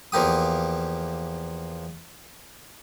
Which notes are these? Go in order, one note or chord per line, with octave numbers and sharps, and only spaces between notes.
E2 F3 A#3 G4 D#6